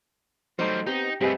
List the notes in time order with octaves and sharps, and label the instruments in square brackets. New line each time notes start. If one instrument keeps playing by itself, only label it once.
[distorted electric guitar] F#3 G3 [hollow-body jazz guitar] A3 D#4 F#4 [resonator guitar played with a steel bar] C5
[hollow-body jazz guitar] B3 C4 [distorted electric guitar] D#4 [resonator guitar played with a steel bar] G4
[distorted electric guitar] G2 A3 [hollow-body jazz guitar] C4 G#4 B4 [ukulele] G4 D#5 G#5